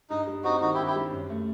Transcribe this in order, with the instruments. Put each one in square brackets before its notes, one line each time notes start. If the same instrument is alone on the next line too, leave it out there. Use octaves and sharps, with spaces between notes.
[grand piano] G2 [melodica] D#4
[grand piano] G3
[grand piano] C4 [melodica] D#4 F#4
[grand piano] D#3 [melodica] D#4 F#4
[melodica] E4 G4
[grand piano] G2
[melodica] E4 G4
[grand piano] G3
F#2
A3